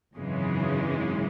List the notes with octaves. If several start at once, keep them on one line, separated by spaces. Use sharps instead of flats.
G#1 F#2 C#3 E3 G#3